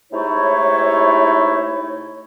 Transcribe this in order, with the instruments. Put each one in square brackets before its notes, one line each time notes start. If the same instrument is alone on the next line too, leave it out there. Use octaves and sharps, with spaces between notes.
[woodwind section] C3 G#3 A3 D#4 E4 C#5